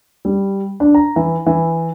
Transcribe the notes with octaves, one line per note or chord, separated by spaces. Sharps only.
G3
D4
A#5
E3
E3